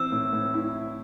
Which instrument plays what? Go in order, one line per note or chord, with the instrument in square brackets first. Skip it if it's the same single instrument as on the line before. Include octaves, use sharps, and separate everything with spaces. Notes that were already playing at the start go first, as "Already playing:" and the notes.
Already playing: [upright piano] E3 C4 [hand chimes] E6
[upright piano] A2
A2
E4